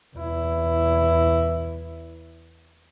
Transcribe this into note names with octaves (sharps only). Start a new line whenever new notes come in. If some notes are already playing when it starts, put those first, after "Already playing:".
E2 E4